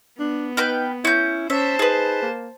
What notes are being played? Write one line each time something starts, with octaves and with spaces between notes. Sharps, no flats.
B3 D4
D#4 B4 G5 F6
C#4 E4 G6
C#4 C5 E5 A5
D#4 G#4 B4
A#3